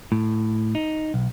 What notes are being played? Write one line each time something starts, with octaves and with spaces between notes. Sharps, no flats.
A2
D#4
B1